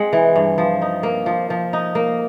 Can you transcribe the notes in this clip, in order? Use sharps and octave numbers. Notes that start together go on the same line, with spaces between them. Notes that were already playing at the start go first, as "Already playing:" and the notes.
Already playing: G#3 C4 F#5
E3
G2
F3
D#4
A#3
F3
F3
D#4
A#3